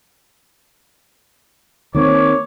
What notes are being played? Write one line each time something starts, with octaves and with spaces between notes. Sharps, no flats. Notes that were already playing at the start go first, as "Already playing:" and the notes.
D#3 A#3 C4 C#5 D6